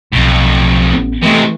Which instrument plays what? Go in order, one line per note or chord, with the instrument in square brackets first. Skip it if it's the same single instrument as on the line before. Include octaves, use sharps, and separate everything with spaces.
[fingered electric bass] B1 [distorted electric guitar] F2 A2
[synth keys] A1 [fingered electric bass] B3
[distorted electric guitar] C3 G#3 [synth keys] E3 A3